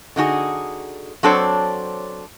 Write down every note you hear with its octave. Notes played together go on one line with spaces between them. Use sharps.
D3 D#4 F#4 G#4
F#3 C4 D4 A4 C5 C#5